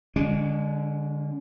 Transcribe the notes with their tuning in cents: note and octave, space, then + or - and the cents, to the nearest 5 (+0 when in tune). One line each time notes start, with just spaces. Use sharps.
D3 +0 G#3 -25 C#4 +35